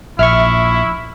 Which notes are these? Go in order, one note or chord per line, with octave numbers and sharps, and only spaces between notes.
A#1 E4 E5 C#6 F6